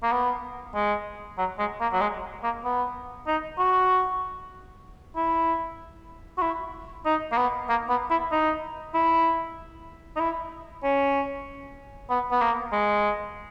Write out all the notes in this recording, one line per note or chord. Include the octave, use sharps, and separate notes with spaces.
A#3
B3
G#3
F#3
G#3
A#3
F#3
G#3
A#3
B3
D#4
F#4
E4
F#4
E4
D#4
A#3
B3
A#3
B3
E4
D#4
E4
D#4
E4
C#4
B3
B3
A#3
G#3